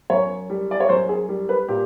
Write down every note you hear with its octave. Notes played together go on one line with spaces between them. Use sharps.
F#2 C#5
G3
D5
C#5
F#2 C5
G#4
G3
B4
A#2 G4